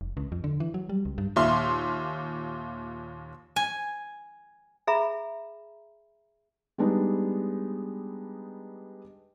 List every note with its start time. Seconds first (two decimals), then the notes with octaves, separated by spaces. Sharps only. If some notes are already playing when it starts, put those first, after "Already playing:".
0.01 F1
0.17 C#2
0.32 F2
0.44 D3
0.60 E3
0.74 F#3
0.89 G3
1.05 C#2
1.18 G2
1.36 D#2 A#2 E5 F5 C6
3.56 G#5
4.87 G#4 E5 A#5 B5
6.78 G3 G#3 B3 D4 D#4